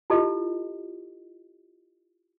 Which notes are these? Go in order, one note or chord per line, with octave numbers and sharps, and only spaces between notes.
E4 F4 G4 A4 D#5